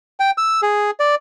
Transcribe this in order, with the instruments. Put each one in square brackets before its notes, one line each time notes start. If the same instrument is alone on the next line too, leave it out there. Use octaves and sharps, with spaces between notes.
[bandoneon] G5
E6
G#4
D5